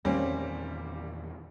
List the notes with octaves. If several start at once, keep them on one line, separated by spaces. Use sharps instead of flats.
E2 A#2 D#3 G3 A3 A#3 C4 C#4